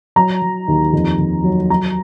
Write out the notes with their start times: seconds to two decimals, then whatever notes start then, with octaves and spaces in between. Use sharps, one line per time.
0.16 F#3 A#5
0.42 F#3
0.68 D#2
0.93 F2
1.19 F2
1.44 F#3
1.70 F#3 A#5